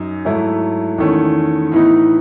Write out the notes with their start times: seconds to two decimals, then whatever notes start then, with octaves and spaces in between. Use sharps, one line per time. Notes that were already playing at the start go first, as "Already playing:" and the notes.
Already playing: F#2 D#4
0.25 G#2 F#3 A3 E4
0.98 E2 D#3 A3 C#4
1.72 A2 E3 B3 D#4